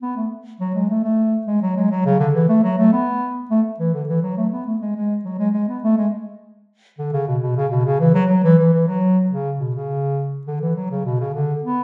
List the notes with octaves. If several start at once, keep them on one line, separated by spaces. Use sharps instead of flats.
B3
A3
F#3
G#3
A3
A3
G#3
F#3
G#3
F#3
C#3
D3
E3
A3
F#3
A3
B3
A3
E3
D3
E3
F#3
A3
B3
A3
G#3
G#3
F#3
G#3
G#3
B3
A3
G#3
D3
C#3
B2
B2
C#3
B2
C#3
E3
F#3
F#3
E3
E3
E3
F#3
C#3
B2
C#3
D3
E3
F#3
C#3
B2
C#3
D3
B3